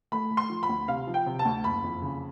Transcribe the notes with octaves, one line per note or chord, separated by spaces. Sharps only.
A3 B5
A3
C6
F3
B5
D2
C3 F5
F3
G5
C3
A5
D2
F#1 B5
F2
C#3